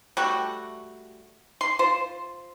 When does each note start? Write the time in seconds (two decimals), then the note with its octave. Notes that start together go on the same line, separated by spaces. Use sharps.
0.17 G3 A3 F#4
1.61 C6
1.79 F4 C5